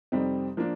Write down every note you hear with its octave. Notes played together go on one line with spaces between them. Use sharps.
F2 C3 G3 C4 D#4
F3 A#3 D4